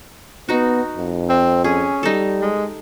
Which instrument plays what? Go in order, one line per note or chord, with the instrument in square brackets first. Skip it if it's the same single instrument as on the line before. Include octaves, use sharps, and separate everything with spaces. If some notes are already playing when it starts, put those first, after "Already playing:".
[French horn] B3 [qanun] D#4 F#4
[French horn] F2
[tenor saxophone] C4
[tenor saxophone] C#4 [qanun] G#4
[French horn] G3 [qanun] D#4 A4
[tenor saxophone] G#3